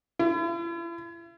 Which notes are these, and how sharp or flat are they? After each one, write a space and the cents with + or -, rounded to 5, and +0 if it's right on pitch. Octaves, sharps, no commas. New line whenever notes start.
E4 +40